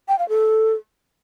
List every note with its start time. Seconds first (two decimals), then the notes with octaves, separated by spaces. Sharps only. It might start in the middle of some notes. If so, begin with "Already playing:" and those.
0.08 G5
0.19 F5
0.29 A4